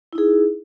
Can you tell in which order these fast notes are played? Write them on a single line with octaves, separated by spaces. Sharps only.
E4 D#4 G#4